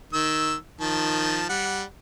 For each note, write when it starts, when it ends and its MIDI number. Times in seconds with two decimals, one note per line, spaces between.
0.13 0.54 51
0.13 0.54 88
0.81 1.46 51
0.81 1.46 53
0.81 1.46 81
1.49 1.83 55
1.49 1.83 78